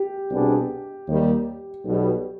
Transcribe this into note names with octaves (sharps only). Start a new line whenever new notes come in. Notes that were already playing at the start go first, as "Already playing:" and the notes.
Already playing: G4
C2 B2 B3 D4 G#4
D#2 D#3 G3
B1 B2 G3